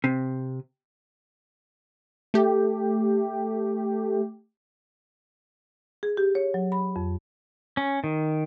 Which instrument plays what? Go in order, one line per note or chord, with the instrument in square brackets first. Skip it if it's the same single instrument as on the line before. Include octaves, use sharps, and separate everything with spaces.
[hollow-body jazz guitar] C3
[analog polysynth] A3 G4
[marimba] G#4
G4
C#5
F#3
B5
F2
[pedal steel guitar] C#4
D#3